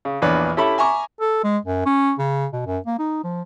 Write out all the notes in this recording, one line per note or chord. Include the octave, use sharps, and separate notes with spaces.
C#3
A#1 E2 D4 B4 C#5
C#4 E4 G4 A4 E5 B5
E5 G#5 A#5 C#6 D6
A4
G#3
F#2
C#4
C#3
B2
F#2
A#3
D#4
F3